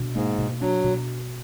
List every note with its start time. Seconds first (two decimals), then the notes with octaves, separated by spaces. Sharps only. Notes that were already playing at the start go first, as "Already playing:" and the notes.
Already playing: B2 D4
0.15 G#2 A#3
0.38 B2
0.61 F#3 D4
0.84 B2